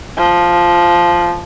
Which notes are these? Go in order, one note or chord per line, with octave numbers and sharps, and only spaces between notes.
F3